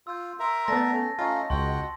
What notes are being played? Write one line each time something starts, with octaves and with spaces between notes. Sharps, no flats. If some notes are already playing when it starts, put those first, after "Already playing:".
F4 E6 G6
A#4 E5 A#5 C6
A3 B3 D5 A5 A6 A#6
C#4 A4
A3 C#4 D#4 F4 D#5
C#2 F#4 F#5 G5 C6